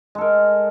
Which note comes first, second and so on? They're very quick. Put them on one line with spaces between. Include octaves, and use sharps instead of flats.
G#3 A4 A#4